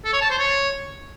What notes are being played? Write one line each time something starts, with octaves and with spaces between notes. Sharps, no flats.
A4
C#5
A5
C5
C#5